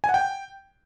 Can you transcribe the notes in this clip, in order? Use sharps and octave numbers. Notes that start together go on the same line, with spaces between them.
G#5
F#5
G5